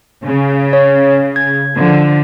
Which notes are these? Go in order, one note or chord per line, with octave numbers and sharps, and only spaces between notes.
C#3
C#5
G#6
D3 F3